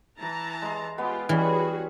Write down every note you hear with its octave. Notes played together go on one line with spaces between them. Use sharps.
E3 A5 A#5
G#3 C6
G#3 B3 F4 G4
E3 G3 C#4 F#4 G#4